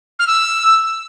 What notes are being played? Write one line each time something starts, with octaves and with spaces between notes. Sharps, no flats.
F6
E6